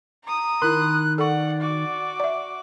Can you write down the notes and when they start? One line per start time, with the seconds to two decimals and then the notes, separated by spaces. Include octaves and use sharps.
0.24 A#5 D#6
0.62 D#3 E4 A#4 B5 C6 F#6
1.18 A4 D5 F#5 C#6
1.61 F#4 D6
2.20 D5 E5